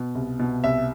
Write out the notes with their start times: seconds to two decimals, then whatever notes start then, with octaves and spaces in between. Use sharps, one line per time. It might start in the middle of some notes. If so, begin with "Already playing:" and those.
Already playing: B2
0.15 C2
0.39 B2
0.64 C2 E5